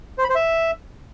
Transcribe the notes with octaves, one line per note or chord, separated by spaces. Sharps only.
C5
B5
C5
E5